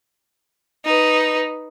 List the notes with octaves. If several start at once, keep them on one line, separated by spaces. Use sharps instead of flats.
D#4 B4